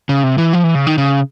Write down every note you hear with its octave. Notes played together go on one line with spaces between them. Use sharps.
C#3
C3
E3
F3
E3
C#3
D#3
C#3